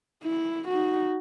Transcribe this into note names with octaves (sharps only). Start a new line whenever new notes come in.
E4
D#4 F#4